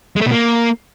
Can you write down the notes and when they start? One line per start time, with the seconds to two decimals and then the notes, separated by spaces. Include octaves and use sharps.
0.16 G#3
0.21 A3
0.26 B2
0.31 A#3